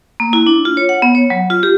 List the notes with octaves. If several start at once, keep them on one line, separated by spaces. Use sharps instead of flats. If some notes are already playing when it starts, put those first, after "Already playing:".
A#3
E4
D4
F4
C#5
F#5
B3
C#5
F#3
F4
G4